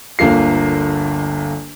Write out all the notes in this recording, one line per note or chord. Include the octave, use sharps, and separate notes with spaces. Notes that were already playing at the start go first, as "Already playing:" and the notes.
G1 D2 A#3 F4 C7